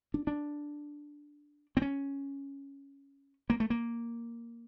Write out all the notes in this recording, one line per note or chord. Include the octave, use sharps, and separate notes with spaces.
D4
D4
C4
C#4
A#3
A3
A#3